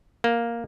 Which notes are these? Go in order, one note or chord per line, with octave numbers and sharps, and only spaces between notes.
A#3